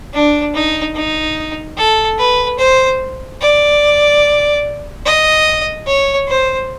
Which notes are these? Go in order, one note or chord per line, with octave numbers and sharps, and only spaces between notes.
D4
D#4
D#4
A4
B4
C5
D5
D#5
C#5
C5